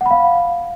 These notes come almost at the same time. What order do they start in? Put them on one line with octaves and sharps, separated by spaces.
F#5 B5 F5